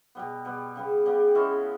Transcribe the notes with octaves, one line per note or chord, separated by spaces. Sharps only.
B2 G3 B3
B2 G3 B3
C#3 G3 B3
C#3 G3 B3
E3 G#3 C#4 E4